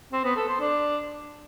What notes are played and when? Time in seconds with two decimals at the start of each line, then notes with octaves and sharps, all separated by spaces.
0.12 C4
0.24 B3
0.36 A4
0.48 C5
0.60 D4